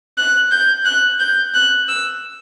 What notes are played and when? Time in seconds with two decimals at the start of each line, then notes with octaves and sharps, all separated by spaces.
0.18 F#6
0.51 G6
0.85 F#6
1.20 G6
1.54 F#6
1.89 E6